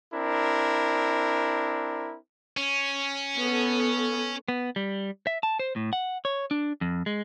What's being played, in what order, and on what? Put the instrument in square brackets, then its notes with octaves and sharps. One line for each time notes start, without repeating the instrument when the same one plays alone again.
[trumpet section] C4 D4 E4 A#4
[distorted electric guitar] C#4
[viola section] B3 A4
[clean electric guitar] B3
G3
E5
A5
C5
A2
F#5
C#5
D4
F2
G#3